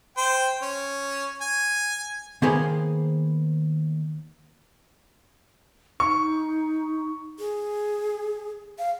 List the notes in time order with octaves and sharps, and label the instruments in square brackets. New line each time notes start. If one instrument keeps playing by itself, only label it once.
[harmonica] C5 G5
C#4
G#5
[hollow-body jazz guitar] D#3 A#3 B3 G#4 C5
[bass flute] D#4 [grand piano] C#6
[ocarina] G#4
F5